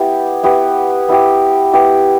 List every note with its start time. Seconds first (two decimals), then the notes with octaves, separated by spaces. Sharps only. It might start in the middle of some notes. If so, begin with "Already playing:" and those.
Already playing: B3 E4 G4
0.43 B3 E4 G4
1.08 B3 E4 G4
1.73 B3 E4 G4